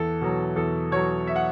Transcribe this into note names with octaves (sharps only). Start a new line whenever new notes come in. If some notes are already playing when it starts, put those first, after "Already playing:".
Already playing: E2 A4
B2 F#3
E2 A4
B2 F#3 C#5
E5
F#5